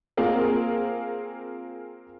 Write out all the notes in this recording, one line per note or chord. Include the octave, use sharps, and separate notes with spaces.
A#3 C4 F4 G#4 A#4